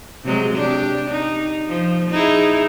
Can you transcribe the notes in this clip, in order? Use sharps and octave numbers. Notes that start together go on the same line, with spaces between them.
C3 F#3 G#3
D4 G4
D#4
F3
D#4 E4 G#4